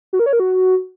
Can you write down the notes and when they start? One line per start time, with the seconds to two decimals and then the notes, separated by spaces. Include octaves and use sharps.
0.13 F#4
0.19 A#4
0.26 C#5
0.33 A#4
0.40 F#4